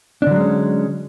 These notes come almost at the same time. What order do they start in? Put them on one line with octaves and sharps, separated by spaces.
D4 D3 F#3 G#3 C#4